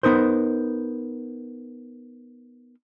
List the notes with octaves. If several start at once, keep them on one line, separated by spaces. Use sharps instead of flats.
B3 D#4 A#4 C5